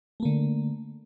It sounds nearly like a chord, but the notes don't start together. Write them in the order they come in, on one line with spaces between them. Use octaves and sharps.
A3 A#3 D3